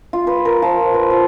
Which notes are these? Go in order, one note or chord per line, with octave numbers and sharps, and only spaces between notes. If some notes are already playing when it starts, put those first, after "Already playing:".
F4
B4
A#4
F3
B4
F3